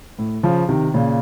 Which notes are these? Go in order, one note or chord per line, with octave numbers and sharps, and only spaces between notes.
A2
C#3 F3
C3 D#3
A#2 C#3